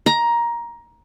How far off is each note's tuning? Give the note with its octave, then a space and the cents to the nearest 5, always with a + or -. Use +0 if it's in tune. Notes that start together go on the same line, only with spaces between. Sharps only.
A#5 +15